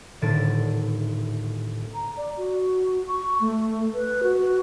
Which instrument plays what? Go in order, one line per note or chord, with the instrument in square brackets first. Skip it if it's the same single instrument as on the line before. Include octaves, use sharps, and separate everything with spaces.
[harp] D#1 A2 D3 A6 D7
[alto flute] A#5
D5
F#4
C#6
A3
B4
F#4